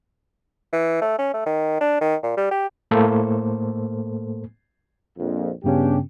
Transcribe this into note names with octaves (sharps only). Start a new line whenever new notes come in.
E3
A3
C#4
A3
D#3
D4
D#3
A#2
G3
G4
A2 A3 A#3 A4 C5
A#1 F2
G2 C#3 B3 C#4 D4 G4